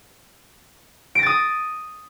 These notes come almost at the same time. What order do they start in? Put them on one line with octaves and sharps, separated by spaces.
D7 A#6 A6 D#6